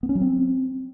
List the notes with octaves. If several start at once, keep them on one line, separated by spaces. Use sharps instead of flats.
B3
C#4
F#3
C4